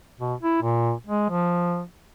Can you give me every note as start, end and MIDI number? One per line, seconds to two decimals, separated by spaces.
0.20 0.34 47
0.43 0.58 64
0.63 0.93 46
1.07 1.28 56
1.30 1.82 53